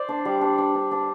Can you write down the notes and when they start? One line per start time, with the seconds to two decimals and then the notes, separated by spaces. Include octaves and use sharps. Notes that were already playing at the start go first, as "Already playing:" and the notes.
Already playing: C5 D5
0.09 D4
0.25 G3
0.41 D4
0.58 D4
0.75 D4
0.91 D4